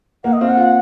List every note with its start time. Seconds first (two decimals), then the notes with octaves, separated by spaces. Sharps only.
0.24 A#3 F#5
0.33 D#5
0.41 C4 F5
0.48 F#5
0.57 F4